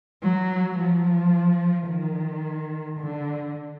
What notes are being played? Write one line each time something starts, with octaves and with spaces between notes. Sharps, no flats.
F#3
F3
D#3
D3